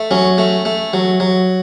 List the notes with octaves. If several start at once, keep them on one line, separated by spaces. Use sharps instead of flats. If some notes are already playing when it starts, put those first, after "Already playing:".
Already playing: A3
F#3 C#4
A3
A3
F#3
F#3